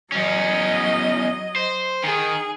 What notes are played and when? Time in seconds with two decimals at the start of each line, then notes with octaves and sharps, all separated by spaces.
0.12 E2 F#3 C#4 D#5
1.56 C5
2.04 D#3 G#4